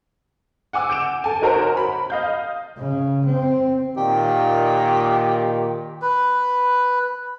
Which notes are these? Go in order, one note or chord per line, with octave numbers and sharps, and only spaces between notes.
F#5 G#5 D6 E6
G6 D7 E7
A4 G#5
D#4 F#4 A#4 C5 C#5 A#5
B5
D#5 F5 G6
C#3
C4
A#2 D#3 G4
B4